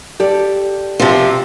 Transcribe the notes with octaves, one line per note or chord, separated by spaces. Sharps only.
G4 A4 D5
C3 F3